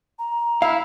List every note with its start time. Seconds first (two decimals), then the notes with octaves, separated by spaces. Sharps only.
0.19 A#5
0.62 E4 F5